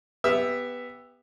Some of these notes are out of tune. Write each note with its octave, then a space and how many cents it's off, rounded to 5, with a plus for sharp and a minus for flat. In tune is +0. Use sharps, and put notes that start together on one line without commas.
B3 +0 G4 +20 E5 +0